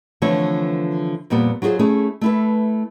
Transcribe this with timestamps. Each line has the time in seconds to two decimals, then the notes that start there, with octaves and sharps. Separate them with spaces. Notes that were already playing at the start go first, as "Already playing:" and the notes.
0.22 D3 E3 F3 A3 C4 C#5
1.30 F2 A#2 G3 B3
1.62 F#3 F4 G4 G#4 C5
1.79 A3 C#4 E4 G#4
2.21 A3 E4 B4